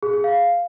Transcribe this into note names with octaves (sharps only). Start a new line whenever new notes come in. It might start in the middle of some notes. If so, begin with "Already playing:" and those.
G#4
G#4
F5